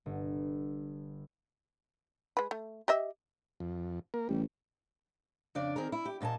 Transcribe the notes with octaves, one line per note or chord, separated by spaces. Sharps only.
G1
G#3 B4
A3
G4 D#5 E5
F2
A#3 A#4
A1 G3
F2 C#3 D4 D5
D#3 C4 G#4 A#4
E4
G4
E2 A#2 D#5 G#5 A5